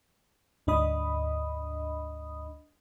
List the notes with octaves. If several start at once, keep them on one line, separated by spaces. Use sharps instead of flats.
D2 G#2 D4 D#5 B5 D#6